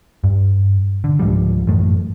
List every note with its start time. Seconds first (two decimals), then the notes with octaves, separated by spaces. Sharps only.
0.24 G2
1.04 D3
1.19 C#2 G#2 F3 G3
1.67 A1 F#2 A3